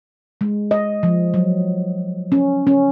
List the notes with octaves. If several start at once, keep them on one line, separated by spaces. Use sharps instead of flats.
G#3
D#5
F3
F#3
C#4
C#4